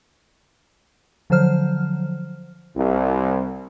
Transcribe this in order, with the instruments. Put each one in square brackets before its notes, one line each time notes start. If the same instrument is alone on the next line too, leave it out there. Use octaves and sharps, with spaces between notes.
[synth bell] D3 F3 F#3 C5 F6
[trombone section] C2